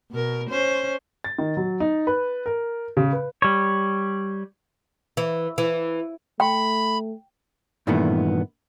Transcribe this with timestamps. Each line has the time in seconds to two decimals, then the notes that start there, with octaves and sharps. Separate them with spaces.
0.11 B2 A#4
0.49 C#4 C5
1.24 A6
1.39 D#3
1.57 F#3
1.80 D#4
2.07 B4
2.46 A#4
2.97 C#3
3.13 B4
3.42 G3 C#5
5.17 E3
5.58 E3
6.40 A3 G5 B5
7.87 G2 A#2 D#3 E3 A3 B3